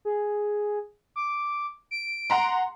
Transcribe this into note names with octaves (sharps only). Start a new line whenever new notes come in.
G#4
D6
D7
F#5 A#5 C6